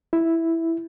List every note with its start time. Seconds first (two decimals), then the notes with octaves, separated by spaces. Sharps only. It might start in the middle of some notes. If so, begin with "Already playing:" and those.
0.13 E4